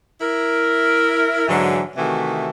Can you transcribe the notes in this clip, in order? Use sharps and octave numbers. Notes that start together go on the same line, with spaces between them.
E4 A#4
G#2 D3 E3 F#3
C3 D#3 E3 A3 F#4